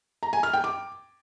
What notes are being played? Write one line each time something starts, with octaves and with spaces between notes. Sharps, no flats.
A#5
G#5
F6
G5
D6